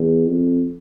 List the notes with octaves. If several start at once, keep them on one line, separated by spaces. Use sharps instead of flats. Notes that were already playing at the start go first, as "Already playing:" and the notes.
Already playing: E2
F2